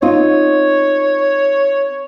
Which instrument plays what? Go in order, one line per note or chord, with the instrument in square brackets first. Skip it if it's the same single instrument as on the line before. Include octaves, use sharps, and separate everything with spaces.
[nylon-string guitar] C4 D#4 F4 [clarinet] C#5